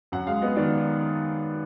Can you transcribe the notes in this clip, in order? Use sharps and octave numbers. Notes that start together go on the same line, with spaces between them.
F#2 F#5
G#3 F5
B3 D#5
D#3 D5